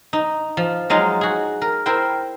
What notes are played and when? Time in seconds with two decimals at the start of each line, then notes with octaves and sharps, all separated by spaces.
0.13 D#4
0.57 F3
0.90 F#3 G#3 D#4 F4
1.21 F#4 G#4
1.62 A#4
1.86 E4 A#4 C5 G5